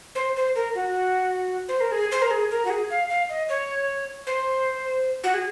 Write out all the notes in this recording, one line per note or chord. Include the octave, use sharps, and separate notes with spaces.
C5
C5
A#4
F#4
C5
A#4
G#4
C5
A#4
G#4
A#4
F#4
G#4
F5
F5
D#5
C#5
C5
F#4
G#4